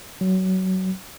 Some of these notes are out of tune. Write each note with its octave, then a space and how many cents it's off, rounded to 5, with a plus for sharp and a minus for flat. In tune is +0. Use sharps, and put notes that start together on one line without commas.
F#3 +20